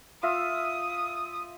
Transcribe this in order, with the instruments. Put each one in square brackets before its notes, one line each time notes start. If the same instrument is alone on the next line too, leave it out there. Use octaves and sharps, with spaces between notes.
[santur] F4 E5 [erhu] D#6